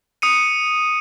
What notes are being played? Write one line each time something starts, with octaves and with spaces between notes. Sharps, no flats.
D#6 C#7 D#7